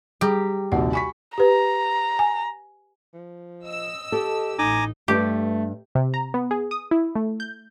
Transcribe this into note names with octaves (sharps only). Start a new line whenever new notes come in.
G3 G4 G#4 A#5
A#1 D#2 C3 F#4 F#5 G5
G#5 B5 C#6 B6
G4 B4 A#5
G#5
F3
D#5 E6
G4 A4
A1 D#4 G#5 A#5 D6
G2 A3 G4 B4
C3
A#5
B3
G#4
D#6
E4
A3
G6